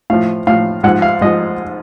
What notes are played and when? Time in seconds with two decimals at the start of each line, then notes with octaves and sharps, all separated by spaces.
0.10 A2 F3 F5
0.47 A2 F3 F5
0.83 G#2 F3 F#5
1.02 F5
1.21 G#2 F3 D#5